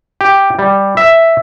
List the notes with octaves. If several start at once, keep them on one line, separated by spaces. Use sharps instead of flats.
G4
G3
E5